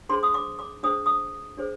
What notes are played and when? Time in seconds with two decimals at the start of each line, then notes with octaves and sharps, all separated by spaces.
0.09 D4 G#4 C5 C6
0.23 D#6
0.34 D6
0.59 D6
0.83 D4 G#4 C5 D#6
1.06 D#6
1.57 D4 G#4 C5